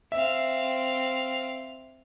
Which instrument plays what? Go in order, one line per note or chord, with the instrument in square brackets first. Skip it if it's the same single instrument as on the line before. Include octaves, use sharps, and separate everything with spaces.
[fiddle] C4 F5 [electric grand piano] E5